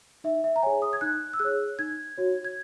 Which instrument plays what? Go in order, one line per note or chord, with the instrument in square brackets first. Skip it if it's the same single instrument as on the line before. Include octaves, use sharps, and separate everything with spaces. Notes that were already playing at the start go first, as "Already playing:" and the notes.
[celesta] D#4 E5
E5
A#5
G#4 C#5 G#5
D#6
G#6
D#4 F#6
E6
G#4 C#5 F#6
D#4 G#6
F#4 C#5
G#6